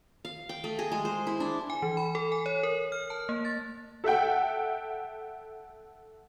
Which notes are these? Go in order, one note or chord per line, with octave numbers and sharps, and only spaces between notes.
F5
G5
A3
G#4
G#3
C5
E4
D4
G#5
E3
B5
A4
G#5
C#5
A#4
F6
A5
A#3
A6
A4 E5 F#5 G5